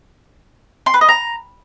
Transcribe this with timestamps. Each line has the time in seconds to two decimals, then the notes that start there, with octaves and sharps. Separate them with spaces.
0.86 C6
0.94 B4
1.01 D#5
1.09 A#5